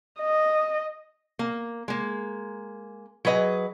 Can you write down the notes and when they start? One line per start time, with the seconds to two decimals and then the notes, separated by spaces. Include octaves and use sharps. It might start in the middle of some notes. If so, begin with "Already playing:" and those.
0.20 D#5
1.39 A#3
1.88 G#3 A#3
3.25 F#3 G#4 B4 D#5